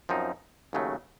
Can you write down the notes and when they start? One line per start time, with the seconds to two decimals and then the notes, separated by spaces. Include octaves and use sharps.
0.09 F#2 F3 C4 D#4
0.73 D#2 C#3 F#3 A3